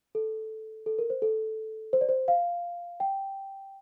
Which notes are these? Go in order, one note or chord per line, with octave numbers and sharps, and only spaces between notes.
A4
A4
A#4
C5
A4
C5
D5
C5
F5
G5